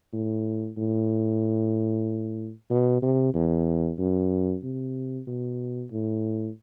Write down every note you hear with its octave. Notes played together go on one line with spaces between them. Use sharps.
A2
A2
B2
C3
E2
F#2
C3
B2
A2